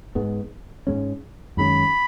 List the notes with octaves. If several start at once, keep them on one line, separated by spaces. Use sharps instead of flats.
G#2 G#3 B3
G#2 G#3 C#4
F#2 D#3 G#3 C#4 B5